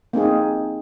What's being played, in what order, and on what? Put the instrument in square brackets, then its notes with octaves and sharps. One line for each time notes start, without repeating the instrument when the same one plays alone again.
[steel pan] A#3 C4 D#4 G#4